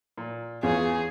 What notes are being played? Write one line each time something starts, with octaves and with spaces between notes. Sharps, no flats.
A#2
E2 F4 G#4 C#5 F5